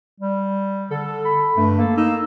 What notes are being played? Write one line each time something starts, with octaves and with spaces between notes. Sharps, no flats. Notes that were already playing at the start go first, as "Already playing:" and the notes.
G3
D3 A4
B5
G2 A3
A#3 A4
D#4 E6